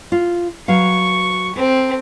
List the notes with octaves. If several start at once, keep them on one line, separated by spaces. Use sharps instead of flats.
F4
F#3 B4 F5 C#6
C4 A4